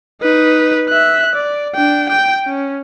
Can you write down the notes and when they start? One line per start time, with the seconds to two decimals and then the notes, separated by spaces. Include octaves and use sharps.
0.22 D#4 B4
0.89 E5 F#6
1.36 D5
1.75 D4 G5
2.09 G5 G6
2.47 C#4